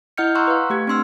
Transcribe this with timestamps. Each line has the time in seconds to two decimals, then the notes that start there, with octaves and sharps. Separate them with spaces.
0.18 E4 D#5 F#5 F6 G6 C#7
0.35 F#5 A#5 C6 C#6 E6 F#6
0.48 B4 F5
0.70 A3 G4 G#6
0.87 C4 D4 C6 E6 F6